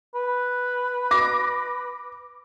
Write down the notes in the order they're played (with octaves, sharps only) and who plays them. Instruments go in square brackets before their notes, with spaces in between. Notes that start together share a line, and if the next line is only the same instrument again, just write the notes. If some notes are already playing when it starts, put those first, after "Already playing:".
[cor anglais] B4
[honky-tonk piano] D6 A#6